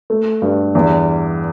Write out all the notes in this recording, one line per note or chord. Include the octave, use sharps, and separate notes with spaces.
A3
G2
E2